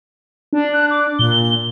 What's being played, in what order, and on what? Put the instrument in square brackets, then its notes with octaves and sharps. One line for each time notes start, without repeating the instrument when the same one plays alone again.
[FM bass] D4
[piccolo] F#6
D6
[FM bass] A#2 [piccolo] G7